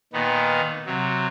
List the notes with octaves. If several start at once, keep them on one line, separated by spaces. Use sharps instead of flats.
A#2 D#3 B3
C3 F#3